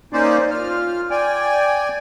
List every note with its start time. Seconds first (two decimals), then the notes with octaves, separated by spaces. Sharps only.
0.13 A#3 C#4 D#4 C5 D5
0.51 F4 F6
1.11 D5 G5 G#5